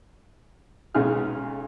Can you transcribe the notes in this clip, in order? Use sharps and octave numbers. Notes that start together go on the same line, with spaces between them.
B1 C#3 G#3 D#4 G#4 F6